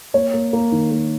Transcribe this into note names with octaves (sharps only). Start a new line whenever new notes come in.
A#3 C#5
A#3
A#3
D#3
A#3